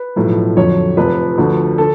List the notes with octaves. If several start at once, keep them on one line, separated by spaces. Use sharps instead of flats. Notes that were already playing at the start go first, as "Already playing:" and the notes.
Already playing: B4
B1 A2 F3
F2 D3 F#3 C#5
F1 F2 F3 B4
D2 D3 F3
D3 A4